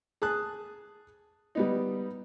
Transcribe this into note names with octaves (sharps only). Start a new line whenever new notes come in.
G#4 A5 D#6 F#6
G3 B3 D#4